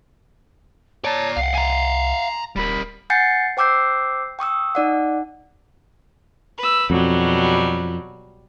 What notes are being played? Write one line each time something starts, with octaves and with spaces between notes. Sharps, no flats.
C#5 D5 A5 A#5
C2 F5 F#5 C7
G#5 A#5
D1 G3 A#4 B5
F#5 G#5 G6 A6 C7 C#7
C5 G5 D6 E6 G6 C7
G5 C#6 D#6 E6
D#4 D5 F#5
B4 E6
F2 B2 F#3 G3